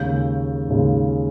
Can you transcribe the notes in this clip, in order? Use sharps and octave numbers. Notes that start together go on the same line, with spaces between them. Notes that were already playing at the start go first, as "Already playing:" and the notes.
Already playing: D#2 C#3 G#3 G6
D#2 C#3 G#3